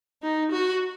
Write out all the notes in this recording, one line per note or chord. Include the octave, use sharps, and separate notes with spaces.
D#4
F#4